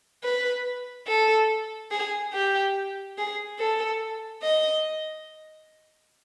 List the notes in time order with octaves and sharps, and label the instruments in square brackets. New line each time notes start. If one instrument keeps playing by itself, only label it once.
[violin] B4
A4
G#4
G4
G#4
A4
D#5